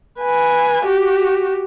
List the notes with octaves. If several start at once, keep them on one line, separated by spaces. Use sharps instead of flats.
B4 G#5
F#4 G4